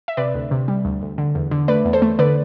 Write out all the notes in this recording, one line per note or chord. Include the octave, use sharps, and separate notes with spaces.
E5
C3 B4 D5
D2
C3
G3
D2
D2
D3
E2
D3
A3 B4 D5
E2
A4 C5
A3
D3 B4 D5